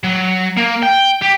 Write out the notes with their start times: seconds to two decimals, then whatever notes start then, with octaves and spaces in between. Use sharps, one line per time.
0.03 F#3
0.57 A#3
0.83 G5
1.22 G4